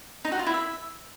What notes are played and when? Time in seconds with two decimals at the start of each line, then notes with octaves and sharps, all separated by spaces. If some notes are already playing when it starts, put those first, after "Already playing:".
0.25 D#4
0.32 F#4
0.39 F4
0.46 E4
0.54 E5